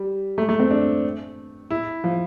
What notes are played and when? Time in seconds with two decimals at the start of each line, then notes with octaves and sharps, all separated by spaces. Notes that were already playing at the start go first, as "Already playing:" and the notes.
Already playing: G3
0.38 A3
0.49 A3
0.60 C4
0.71 D4
1.70 E4
2.04 F3